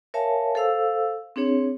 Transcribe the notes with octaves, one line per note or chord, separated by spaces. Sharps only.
A#4 C#5 E5 F5 G#5 A5
A4 C5 F5 E6
C4 D4 G#4 C#5